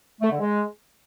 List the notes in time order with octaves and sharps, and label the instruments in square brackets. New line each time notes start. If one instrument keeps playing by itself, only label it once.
[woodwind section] A3
D3
G#3